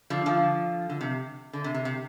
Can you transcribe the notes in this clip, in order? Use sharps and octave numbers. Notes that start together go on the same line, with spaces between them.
D3 F3
D3 F3
D3
C3
D3
C3
C3
C3